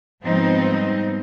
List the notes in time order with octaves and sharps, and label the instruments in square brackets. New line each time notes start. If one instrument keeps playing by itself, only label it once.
[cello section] G#2 F3 G3 B3 C4 D#4